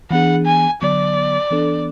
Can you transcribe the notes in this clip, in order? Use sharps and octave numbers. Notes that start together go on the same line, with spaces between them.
E3 B3 D4 G#4 F#5
G#5
D3 F#3 B3 D5
E3 B3 D4 A4